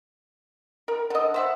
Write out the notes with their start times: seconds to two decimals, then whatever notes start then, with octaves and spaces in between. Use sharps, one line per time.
0.88 A#4
1.10 D3 D#5
1.34 C5 E5 F#5